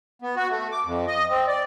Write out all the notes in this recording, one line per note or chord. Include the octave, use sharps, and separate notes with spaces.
B3
F#4
A3
D6
F2
D#5
C4
D5